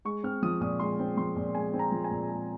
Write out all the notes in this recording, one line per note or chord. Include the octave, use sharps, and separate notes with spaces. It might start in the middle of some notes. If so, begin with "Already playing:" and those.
G#3 C#6
C4 F6
F3 D#6
A#2 D#6
G#3 C6
C4
F3 C6
A#2
G#3 G#5
C4
A#5
F3
G#5
A#2
G#3 A#5